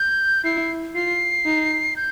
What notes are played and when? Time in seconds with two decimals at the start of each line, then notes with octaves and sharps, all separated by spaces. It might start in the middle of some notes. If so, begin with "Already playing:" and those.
Already playing: G6
0.45 E4 C7
0.95 F4 C7
1.46 D#4
1.96 G6